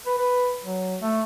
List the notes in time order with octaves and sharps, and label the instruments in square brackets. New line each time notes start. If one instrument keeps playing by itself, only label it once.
[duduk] B4
B4
F#3
A3